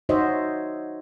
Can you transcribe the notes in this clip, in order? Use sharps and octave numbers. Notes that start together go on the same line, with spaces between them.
D#4 F#4 C5 C#5 D#5 E5